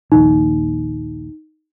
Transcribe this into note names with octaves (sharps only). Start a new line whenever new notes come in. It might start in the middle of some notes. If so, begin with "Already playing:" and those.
A#1 D#2 D#4